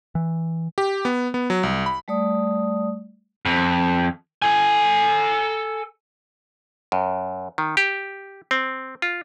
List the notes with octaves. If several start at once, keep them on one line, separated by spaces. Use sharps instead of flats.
E3
G4
B3
B3
F#3
C2
B5
G3 A3 D5 D#6
F2
A4 G#5
F#2
D#3
G4
C4
F4